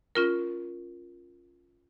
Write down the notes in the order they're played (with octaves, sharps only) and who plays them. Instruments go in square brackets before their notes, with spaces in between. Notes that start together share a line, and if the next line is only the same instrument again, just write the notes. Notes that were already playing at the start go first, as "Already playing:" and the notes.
[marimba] C#4 F4 A#4